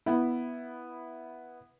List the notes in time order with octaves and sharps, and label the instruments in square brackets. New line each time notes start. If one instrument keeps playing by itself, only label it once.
[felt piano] B3 E4